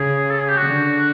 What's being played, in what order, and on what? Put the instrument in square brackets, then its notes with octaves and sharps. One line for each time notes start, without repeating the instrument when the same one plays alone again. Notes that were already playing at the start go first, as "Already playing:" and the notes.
Already playing: [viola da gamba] C#3 [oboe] G#4
[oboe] A4
G#4
G4
F#4
[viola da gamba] D3